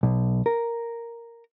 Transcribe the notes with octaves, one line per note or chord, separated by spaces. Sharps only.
B1
A#4